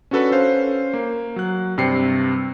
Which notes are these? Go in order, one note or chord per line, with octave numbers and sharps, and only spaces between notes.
C#4 D4 F#4 A4 B4
C#4 C5 F5
A#3
F#3 F#6
G2 C3 G5 C7 C#7